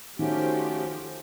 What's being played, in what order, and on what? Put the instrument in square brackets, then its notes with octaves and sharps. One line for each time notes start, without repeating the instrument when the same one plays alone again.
[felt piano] D#3 [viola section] F3 G4 [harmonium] A3 C#4 F#4